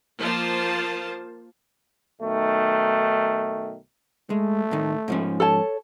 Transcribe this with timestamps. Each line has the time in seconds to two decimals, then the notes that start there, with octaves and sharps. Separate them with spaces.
0.21 F3 A#3 F4 C5 A5
2.22 B1 D#3 A3
4.30 G#3 A3
4.71 A2 D#3
5.08 G#2 F3 C#4
5.40 A4 C#5 A5